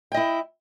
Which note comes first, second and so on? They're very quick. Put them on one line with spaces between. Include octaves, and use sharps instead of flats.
G5 D#5 E4